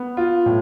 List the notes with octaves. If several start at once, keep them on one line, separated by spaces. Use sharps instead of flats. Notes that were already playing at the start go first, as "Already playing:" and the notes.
Already playing: B3
F4
A2